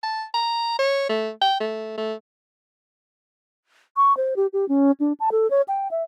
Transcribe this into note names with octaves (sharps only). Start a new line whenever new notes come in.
A5
A#5
C#5
A3
G5
A3
A3
C#6
C5
G4
G4
C#4
D4
A5
A4
C#5
G5
E5